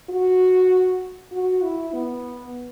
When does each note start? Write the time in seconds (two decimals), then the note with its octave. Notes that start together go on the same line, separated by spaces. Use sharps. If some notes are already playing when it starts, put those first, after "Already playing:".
0.09 F#4
1.32 F#4
1.62 E4
1.93 B3